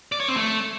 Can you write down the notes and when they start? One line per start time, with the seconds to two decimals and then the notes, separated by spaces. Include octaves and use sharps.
0.12 D5
0.20 C#5
0.28 C4
0.36 A3